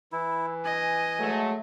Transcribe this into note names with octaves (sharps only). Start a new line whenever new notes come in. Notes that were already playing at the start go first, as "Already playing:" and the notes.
E3 E4
D#5 G#5
F#3 G#3 A3